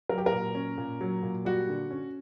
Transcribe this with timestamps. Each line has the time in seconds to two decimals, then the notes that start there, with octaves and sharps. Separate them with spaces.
0.09 F#3 A#4
0.18 G4
0.26 A#4
0.32 A#2
0.55 C#4
0.78 A#2
1.01 F#3
1.23 A#2
1.45 G3 F#4
1.69 D3
1.91 C#4